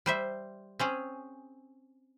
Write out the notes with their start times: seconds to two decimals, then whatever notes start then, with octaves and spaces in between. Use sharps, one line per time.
0.06 G3 C5 E5
0.79 C4 C#4 G#4